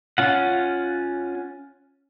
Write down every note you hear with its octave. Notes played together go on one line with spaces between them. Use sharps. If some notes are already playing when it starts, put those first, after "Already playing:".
C#4 F4 F#5